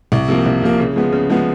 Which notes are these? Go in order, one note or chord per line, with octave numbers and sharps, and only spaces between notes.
C2
C3 F3 A#3
C2
C3 F3 A#3
C#3
F3 G#3 B3
C#3
F3 G#3 B3